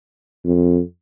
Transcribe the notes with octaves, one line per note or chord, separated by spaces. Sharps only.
F2